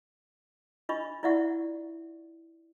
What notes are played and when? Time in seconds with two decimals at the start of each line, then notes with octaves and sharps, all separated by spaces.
0.89 D4 F4 D#5 B5 C#6
1.23 E4 F4 D5 E5 F#5 C#6